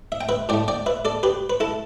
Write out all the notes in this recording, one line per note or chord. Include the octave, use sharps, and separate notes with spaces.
E5
G5
B4 E5
A2 A3 D5 G5
D5 G5
B4 E5
A4 D5
G4 B4
B4
E4 A4